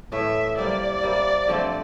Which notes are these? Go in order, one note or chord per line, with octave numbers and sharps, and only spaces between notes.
A2 E3 A3 E5
C3 G3 A#3 D5
C3 G3 A#3
D3 F3 A3 C4